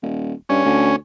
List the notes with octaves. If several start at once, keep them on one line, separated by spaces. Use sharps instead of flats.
D#1
G2 C#4
D2